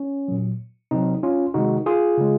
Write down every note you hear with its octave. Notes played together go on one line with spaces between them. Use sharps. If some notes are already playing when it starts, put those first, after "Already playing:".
Already playing: C#4
A#2 F#3
C3 F#3 C4 D#4
C#4 F4
C3 D#3 G#3 D#4 F#4
F4 G#4
C#3 G#3